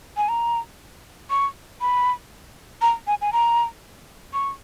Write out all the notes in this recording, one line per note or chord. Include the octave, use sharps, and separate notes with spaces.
G#5
A#5
C#6
B5
A#5
G#5
G#5
A#5
C#6